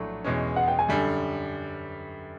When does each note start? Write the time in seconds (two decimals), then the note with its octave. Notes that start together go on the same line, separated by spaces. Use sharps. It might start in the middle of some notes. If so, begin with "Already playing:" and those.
Already playing: A#1 A2 F#3 A3 D4
0.24 E2 B2 G#3 C#4
0.56 F#5
0.68 G5
0.79 G#5
0.88 F#2 D3 G3